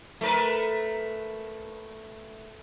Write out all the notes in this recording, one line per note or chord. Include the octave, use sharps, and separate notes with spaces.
A3 A#4 B4